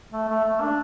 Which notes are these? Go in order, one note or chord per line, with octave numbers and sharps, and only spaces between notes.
A3
A3
A3
D4